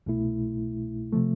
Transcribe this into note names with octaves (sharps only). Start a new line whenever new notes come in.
C2 B2 A3 E4
C3 F3 A3